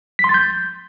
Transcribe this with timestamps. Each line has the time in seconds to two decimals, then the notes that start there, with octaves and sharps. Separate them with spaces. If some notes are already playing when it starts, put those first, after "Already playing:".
0.19 B6
0.24 C6
0.29 A6
0.34 G6